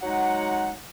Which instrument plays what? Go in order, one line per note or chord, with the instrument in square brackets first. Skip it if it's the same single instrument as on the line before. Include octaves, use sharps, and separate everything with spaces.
[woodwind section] F#3 G#3 D#4 F#5